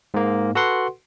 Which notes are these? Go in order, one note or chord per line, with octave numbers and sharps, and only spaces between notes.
G#2 A#3
F#4 A4 B4 F#5 C6